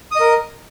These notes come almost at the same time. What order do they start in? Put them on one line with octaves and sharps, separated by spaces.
D#6 D#5 A#4